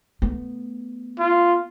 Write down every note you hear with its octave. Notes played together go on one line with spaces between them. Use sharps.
A3 B3
F4